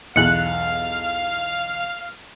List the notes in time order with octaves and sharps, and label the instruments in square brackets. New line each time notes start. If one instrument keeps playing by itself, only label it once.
[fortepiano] B1 E2 [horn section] F5 [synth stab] F#6 C#7